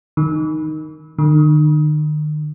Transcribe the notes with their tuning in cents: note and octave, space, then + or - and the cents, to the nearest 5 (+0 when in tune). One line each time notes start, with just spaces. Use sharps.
D#3 +0
D#3 -45